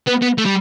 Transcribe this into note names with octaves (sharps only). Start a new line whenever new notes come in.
B3
B3
A3
G3